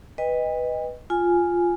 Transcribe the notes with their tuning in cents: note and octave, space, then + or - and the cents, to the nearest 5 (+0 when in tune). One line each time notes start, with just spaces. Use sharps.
B4 +0 D#5 +0 G5 +45
F4 +0 G#5 +0